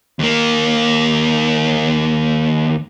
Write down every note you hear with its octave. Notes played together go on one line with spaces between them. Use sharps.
D#2 A#3